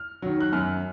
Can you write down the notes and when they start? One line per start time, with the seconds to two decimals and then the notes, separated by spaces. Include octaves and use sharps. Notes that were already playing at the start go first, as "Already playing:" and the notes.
Already playing: F6
0.22 D#3 F#3
0.40 F#6
0.53 F#2 F6